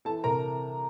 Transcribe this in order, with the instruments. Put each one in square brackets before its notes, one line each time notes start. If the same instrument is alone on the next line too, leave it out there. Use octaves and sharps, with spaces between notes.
[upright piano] E3 A4 A5
C3 A#4 A#5